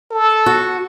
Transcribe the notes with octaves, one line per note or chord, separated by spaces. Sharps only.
A4
F#4